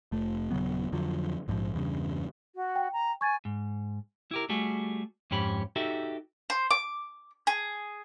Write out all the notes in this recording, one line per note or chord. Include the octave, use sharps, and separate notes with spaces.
F1 A3
D#1 C#3 F#3 B3
F2 D3 F3 F#3
A#1 G#2 E3 F3
E2 G2 C#3
F#4
G5
A#5
G#5 C#6 G#6 A6
G#2
E4 G4 A#4
G3 A3 F#4 G#4
F2 G#2 C#4 G4 B5
D#4 F#4 G4 A4 E5
C5
D6
G#4